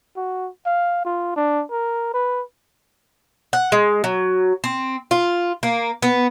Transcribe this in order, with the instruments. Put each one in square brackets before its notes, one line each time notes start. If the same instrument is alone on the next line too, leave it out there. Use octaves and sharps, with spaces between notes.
[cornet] F#4
F5
F4
D4
A#4
B4
[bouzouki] F#5
G#3
F#3
C4
F4
A#3
B3